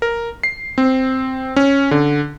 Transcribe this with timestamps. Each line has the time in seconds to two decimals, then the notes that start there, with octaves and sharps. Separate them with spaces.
0.02 A#4
0.43 C7
0.78 C4
1.56 C#4
1.91 D3